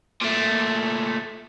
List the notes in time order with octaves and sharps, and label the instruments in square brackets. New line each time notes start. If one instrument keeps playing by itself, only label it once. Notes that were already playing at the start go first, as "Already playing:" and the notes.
[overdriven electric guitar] A#2 A3